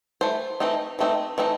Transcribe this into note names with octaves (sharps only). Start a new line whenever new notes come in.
E3 A3 C5
E3 A3 C4 D#4
E3 A3 C4 D#4
E3 A3 C4 D#4